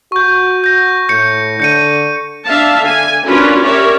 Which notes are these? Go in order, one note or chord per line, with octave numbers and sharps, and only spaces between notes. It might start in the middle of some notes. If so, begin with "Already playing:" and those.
F#4 C#6 G6
G6 A#6
A2 G6 C#7
D3 G6 C#7 D#7
D4 E5 F5 A5
D3 G#5
C#4 D4 F4 F#4 A#4 B4
G4 A#4 C#5 D5 E5